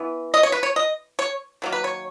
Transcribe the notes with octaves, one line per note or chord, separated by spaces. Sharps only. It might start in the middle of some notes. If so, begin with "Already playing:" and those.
Already playing: E3 B3
D#5
C#5
B4
C#5
D#5
C#5
D#3 F#3 A#3
B4
C#5